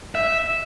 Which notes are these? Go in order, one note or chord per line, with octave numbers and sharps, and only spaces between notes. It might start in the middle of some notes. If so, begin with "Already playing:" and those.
E5